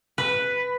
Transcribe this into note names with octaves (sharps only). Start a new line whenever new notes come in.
B4